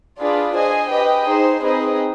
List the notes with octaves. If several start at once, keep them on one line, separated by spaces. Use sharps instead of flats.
D4 F4 G#4 B4 D5
G#4 C5 D#5 G#5
G4 B4 D#5 G5
D#4 G#4 C5
C4 D#4 G#4 B4 D#5